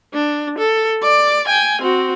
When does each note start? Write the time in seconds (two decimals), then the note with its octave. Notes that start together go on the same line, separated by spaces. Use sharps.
0.13 D4
0.58 A4
1.03 D5 D6
1.48 G5 G#5
1.82 C4 F#4